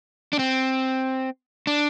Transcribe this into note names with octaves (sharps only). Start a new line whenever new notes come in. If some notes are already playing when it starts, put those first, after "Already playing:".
D4
C4
D4